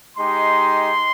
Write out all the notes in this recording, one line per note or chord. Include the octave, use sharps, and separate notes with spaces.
G#3 D#4 G4 C6